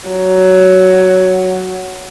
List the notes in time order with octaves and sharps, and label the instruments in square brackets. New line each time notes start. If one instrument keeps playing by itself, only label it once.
[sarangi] F#3